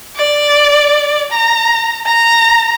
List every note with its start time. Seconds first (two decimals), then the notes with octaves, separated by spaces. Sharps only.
0.16 D5
1.32 A#5
2.06 A#5